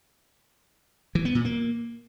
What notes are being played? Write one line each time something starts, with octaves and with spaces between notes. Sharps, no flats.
E3
B3
A#2
A#3